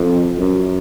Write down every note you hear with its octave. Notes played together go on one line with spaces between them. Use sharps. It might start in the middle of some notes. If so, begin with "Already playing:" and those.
Already playing: F2
F#2